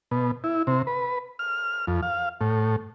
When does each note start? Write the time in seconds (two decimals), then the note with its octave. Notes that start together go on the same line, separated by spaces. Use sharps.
0.11 B2
0.44 E4
0.67 C3
0.87 B4
1.39 F6
1.87 F2
2.03 F5
2.41 A2